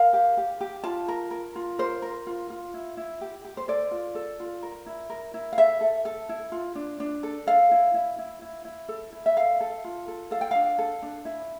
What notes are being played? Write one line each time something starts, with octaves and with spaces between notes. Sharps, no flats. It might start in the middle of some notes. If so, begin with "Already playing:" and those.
Already playing: A#4 F5
G4
G4
G4
F4 A5
A#4
A#4
F4
A#4 C5
A#4
F4
F4
E4
E4
G4
G4
C5
A4 D5
F4
A4
F4
A#4
E4
A#4
E4
F5
A4 E5
A4
A4
E4
F4
D4
D4
A4
A4 F5
E4
E4
E4
E4
E4
A4
E4
E5
A4 F5
A4
F4
A4
A4 F5
G5
D4 F5
A4
D4
E4